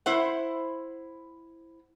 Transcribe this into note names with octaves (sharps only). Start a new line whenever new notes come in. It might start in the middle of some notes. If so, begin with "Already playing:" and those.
E4 C5 F#5